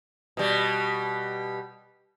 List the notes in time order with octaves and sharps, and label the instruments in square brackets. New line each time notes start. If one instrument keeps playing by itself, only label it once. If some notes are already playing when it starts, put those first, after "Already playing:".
[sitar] B2 G3